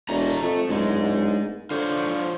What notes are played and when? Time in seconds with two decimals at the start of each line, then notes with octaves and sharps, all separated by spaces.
0.09 E1 A3 A#5
0.42 F2 A3
0.69 D1 G#3 D#4
1.71 D3 F4 C5 C#5